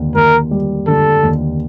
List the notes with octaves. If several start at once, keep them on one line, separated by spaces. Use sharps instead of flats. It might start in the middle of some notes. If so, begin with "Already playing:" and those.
Already playing: D#2 D3
D#2 A#4
G3
D3 A4
D#2